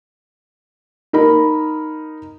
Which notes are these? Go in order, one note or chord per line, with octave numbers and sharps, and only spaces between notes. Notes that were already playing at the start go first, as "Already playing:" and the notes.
D#4 A#4 B5